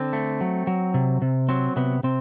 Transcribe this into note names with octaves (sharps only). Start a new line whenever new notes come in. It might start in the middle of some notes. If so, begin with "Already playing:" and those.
Already playing: D3 C4
A3
F#3
F#3
C3
C3
F#3 C4
C3 B3
C3 C4